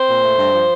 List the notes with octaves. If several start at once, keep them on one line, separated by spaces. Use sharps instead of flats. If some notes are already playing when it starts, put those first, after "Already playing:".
Already playing: C4 C5
A#2
A3
G2
F3